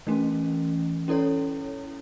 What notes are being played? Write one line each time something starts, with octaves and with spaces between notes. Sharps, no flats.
E3 A3 C#4
C#4 E4 A4 C#5